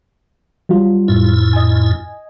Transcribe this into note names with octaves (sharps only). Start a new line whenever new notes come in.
F#3 G3 F4
F2 A2 E4
D#5 G#5